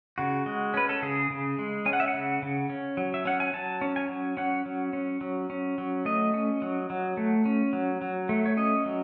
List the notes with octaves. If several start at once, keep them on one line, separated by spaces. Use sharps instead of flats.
C#3 F#4
G#3
C#4 B4
A4
C#3 G#4
C#3
G#3
C#4 G#5
F#5
E5
F#5
C#3
C#3
C#4
F#3
E5
C#4 F#5
G#5
F#3 A5
C#4
G#5
F#3
C#4 F#5
F#3
C#4
F#3
C#4
F#3
A3 D#5
C#4
F#3
F#3
A3
C#4
F#3
F#3
A3
C#5
C#4 D#5
F#3